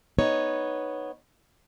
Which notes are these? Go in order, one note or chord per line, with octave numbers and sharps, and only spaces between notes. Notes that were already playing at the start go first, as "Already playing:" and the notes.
B3 D#4 C#5